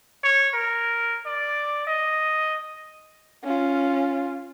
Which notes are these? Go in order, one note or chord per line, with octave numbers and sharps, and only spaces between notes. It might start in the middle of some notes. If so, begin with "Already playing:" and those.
C#5
A#4
D5
D#5
C#4 F4